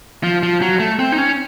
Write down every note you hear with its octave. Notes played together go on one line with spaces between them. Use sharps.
F3
F3
F#3
A3
C4
D#4
C#4